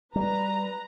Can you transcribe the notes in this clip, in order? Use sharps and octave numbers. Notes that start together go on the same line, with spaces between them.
G3 B4 A#5